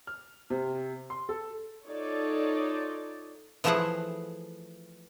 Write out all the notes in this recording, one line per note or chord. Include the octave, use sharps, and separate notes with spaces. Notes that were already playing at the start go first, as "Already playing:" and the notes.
F6
C3
C6
A4
D#4 F4 A4 C#5 D5
E3 F3 A3 E4 G#4 F#5